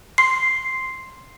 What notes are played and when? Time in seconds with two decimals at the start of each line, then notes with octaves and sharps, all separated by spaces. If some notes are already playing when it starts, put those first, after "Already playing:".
0.18 C6 C7